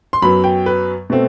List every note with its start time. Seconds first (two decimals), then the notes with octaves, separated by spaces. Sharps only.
0.13 C6
0.22 F#2 F#3 B3 B5
0.44 G5
0.66 B4
1.10 B2 A3 C4